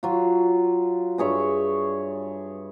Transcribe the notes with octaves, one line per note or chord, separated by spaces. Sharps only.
F#3 F4
G2 G#4 C#5 E5